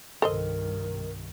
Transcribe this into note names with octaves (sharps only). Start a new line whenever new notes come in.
C2 G2 D#3 A4 A#4 C5 D#5